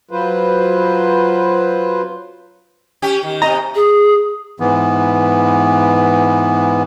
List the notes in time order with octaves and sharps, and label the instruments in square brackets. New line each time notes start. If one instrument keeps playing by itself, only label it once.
[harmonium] F#3 F4 B4 C5
[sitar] C#4 G4
D#3
[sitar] C3 D#5 [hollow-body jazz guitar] A#5
[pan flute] G#4
[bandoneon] G#2 E3 B3